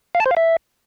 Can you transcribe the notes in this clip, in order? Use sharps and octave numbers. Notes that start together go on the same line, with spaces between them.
F5
A5
C5
F5
E5